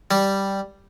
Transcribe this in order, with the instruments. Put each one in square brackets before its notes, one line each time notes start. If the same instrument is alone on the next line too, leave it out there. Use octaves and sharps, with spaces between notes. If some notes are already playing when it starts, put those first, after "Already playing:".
[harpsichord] G3